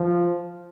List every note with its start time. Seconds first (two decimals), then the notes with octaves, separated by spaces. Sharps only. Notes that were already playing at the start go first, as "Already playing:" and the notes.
Already playing: F3